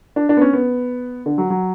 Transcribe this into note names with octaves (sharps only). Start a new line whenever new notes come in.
D4
D4
B3
C#4
B3
D3
F#3
F#3